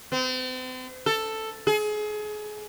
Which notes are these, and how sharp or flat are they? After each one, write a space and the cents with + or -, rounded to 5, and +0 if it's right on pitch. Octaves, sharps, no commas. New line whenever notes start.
C4 -40
A4 +5
G#4 +30